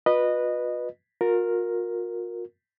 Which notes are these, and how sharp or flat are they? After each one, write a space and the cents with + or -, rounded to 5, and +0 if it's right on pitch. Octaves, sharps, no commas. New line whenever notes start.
F4 +45 B4 -10 D#5 -20
F4 +45 A#4 +0